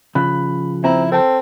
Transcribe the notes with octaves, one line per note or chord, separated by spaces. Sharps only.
C#3 F3 B5 F#6
C4 E4 A#5
C4 A4 A5